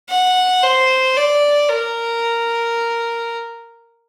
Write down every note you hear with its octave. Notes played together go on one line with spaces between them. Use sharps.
F#5
C5
D5
A#4